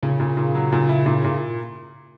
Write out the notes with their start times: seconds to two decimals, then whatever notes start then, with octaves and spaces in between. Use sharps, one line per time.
0.03 A#2 C#3
0.20 A#2
0.37 A#2
0.55 F#3
0.72 A#2
0.89 E4
1.06 A#2
1.24 A#2